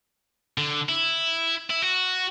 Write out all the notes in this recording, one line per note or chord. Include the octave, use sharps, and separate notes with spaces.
D3
E4
E4
F#4